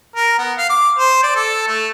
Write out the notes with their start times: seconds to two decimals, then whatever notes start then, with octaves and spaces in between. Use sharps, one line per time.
0.16 A#4
0.38 B3
0.58 F5
0.70 D6
0.98 C5
1.23 D5
1.36 A4
1.68 A3